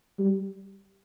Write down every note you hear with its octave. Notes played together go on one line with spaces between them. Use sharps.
G3